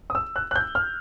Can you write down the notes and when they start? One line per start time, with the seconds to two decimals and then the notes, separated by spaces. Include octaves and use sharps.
0.10 D#6
0.15 E6
0.36 F#6
0.51 F#6
0.56 G6
0.75 F6